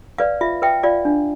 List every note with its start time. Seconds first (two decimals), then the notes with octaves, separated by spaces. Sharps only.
0.18 B4 D5 F5
0.41 F4 E5
0.62 B4 E5 G5
0.83 F4 D5 F5
1.05 D4